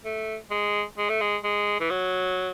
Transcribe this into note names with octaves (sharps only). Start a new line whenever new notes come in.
A3
G#3
G#3
A3
G#3
G#3
E3
F#3